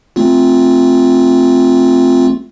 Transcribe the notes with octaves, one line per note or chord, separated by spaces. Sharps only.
A3 C4 F4